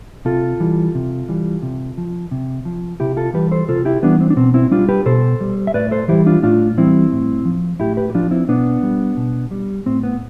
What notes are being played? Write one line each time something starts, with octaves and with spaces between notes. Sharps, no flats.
C3 F4 A4
E3 G3
C3
E3 G3
C3
F3
C3
F3
C3 E4 G4
F4 A4
E3 G3 G4 B4
A4 C5
C3 F4 A4
E4 G4
E3 G3 B3 D4
C4
D4
B2 C4
C4 E4
G3 D4 F4
G4 B4
B2 A4 C5
G3
E5
A2 B4 D5
A4 C5
E3 G3 E4 G4
D4 F4
A2 D4 F4
E3 G3 C4 E4
A2
F3
A2 E4 G4
G4 B4
G4
F3 D4 F4
C4 E4
B2 B3 D4
G3
B2
G3
A2 C4
B3